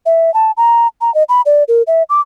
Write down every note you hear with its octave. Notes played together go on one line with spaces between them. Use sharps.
E5
A5
A#5
A#5
D#5
B5
D5
A#4
E5
D6